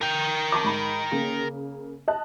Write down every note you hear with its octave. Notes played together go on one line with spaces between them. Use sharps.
A#4 G5 F7
A5 C#6 D6
G#2 B5
C#3 A#3
D#5 A5 F#6